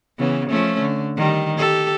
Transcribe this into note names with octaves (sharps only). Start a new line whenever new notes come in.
C#3 E3 B3
F3 A3 C#4
D3
D#3 G3
G4 A4